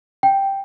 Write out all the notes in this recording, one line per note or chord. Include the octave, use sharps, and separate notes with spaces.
G5